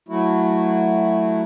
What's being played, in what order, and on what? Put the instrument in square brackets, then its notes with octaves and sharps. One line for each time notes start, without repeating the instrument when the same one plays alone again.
[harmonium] F#3 A3 E4 F#4